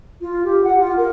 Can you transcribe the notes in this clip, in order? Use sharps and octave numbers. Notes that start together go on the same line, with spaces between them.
F4
G4
F#5
F4
A#4